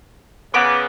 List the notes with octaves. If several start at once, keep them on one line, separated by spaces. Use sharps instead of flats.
C#3 B3 D6